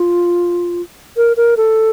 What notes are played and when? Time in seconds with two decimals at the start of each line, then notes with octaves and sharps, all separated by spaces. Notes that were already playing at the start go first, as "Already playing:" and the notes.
Already playing: F4
1.17 A#4
1.37 A#4
1.57 A4